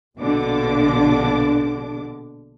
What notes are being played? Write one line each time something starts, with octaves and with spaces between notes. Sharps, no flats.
A#1 B2 D3 D4 D6